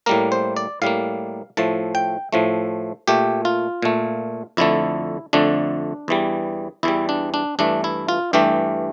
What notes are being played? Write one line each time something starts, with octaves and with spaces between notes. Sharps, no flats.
A2 G3 A#3 A#4
C5
D5
A2 G3 A#3 F5
A2 F3 A3 A5
G5
A2 F3 A3
A#2 A3 G4
F4
A#2 A3
F2 D3 A3 E4
F2 D3 A3 D4
E2 E3 G3
E2 E3 G3 E4
D4
D4
G2 E3 A3 D4
E4
F4
G2 E3 A3 G4